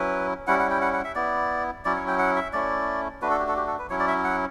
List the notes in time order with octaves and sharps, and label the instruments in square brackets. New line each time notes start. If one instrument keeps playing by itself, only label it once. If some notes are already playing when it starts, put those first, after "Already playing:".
Already playing: [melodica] F#3 C#4 E4 B4
G3 C#4 E4 F#5
F#5
G5
F#5
F#5
E5
B3 E4 D5
F#3 C#4 E4 D5
C#5
G5
F#5
E5
A3 C#4 E4 D5
A3 D4 F#4 B4
A4
G4
A4
G4
A4
B4
F#3 C#4 E4 C#5
D5
E5
F#5